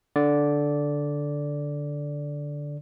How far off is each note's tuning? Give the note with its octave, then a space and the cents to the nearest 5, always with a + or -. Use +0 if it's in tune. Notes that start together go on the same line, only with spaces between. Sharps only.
D3 -5 D5 -10